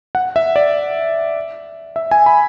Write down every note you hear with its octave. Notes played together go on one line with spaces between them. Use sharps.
F#5
E5
D5
E5
G#5
B5